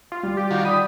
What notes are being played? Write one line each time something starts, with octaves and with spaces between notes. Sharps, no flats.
F4
G3
G4
D#3 F4 F#4
D5 B5 D#6 D#7